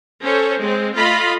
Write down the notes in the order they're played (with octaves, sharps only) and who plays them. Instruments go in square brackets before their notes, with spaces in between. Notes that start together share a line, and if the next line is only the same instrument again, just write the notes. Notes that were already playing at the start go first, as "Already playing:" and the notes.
[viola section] C#4 A4 C5 C#5
G#3 C4
A3 F4 D#5 B5